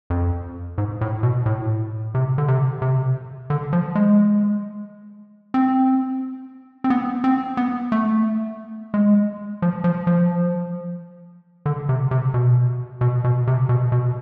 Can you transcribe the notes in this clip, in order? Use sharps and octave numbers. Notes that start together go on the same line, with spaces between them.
F2
G#2
A2
B2
A2
C3
D3
C3
C3
D3
F3
G#3
C4
C4
B3
C4
B3
A3
G#3
F3
F3
F3
D3
C3
C3
B2
B2
B2
C3
B2
B2